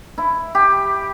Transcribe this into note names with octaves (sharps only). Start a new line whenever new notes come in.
E4
G4